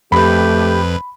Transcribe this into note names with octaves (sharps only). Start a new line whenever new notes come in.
F2 A3 G4 B4 B5